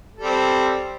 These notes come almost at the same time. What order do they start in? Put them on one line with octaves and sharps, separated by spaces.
A4 G3 C4